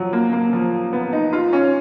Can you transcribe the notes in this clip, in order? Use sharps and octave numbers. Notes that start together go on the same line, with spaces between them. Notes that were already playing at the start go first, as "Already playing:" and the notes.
Already playing: F3 F#3
A#3
A#3
F3
B3
D#4
F4
C#4